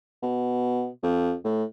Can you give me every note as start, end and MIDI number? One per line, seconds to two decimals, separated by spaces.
0.22 0.88 47
1.03 1.34 41
1.44 1.64 45